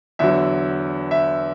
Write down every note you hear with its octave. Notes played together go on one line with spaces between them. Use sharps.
E2 D3 F#3 E5
E5